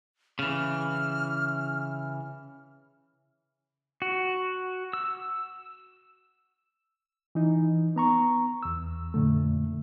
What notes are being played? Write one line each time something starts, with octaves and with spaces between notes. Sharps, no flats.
C#3 E3 F6
F#4
E6
E3 D#4
B3 A#5 C#6
E2 E6
F2 A#2 D3 A3